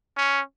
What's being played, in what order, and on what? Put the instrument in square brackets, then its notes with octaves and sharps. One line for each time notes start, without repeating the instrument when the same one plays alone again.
[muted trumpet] C#4